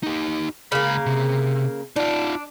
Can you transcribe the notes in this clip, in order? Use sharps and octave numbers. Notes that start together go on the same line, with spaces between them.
D#4 G4
C#2 C#3 A#3 B5
C3
D4 D#4 F4